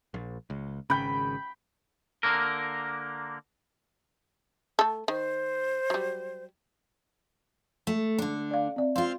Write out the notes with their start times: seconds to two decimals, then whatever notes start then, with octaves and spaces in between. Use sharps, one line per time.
0.14 A#1
0.50 C#2
0.90 G#1 C#3 G5 B5
2.23 D3 A#3 A#4
4.79 A3 A4
5.08 D#3 C5
5.90 F#3 G3
7.87 A3
8.18 D3 D4
8.51 D5 F5
8.76 C4 D5 E5
8.96 C4 F4 F5 C6